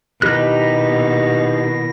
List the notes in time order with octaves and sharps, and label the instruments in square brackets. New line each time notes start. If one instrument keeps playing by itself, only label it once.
[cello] B2 [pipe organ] D#3 E4 A#6 [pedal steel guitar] D#4 G4 F#6